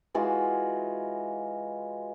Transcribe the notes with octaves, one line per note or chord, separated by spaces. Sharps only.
E3 G#3 F4 F#4